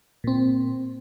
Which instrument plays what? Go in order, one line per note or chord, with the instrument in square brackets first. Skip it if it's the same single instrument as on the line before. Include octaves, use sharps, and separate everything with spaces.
[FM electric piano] A#2 C4